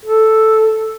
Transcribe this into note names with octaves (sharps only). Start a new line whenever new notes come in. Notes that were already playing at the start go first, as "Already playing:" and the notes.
A4